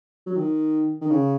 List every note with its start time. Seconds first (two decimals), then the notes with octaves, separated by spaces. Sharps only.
0.27 F#3
0.36 D#3
1.01 D#3
1.10 C#3